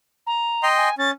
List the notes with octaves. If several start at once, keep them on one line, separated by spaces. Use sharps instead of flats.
A#5
D#5 G5 C6
G#5
C#4 A6